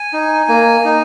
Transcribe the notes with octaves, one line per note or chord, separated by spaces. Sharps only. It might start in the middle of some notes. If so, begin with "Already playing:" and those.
Already playing: G#5
D#4
A#3
D#4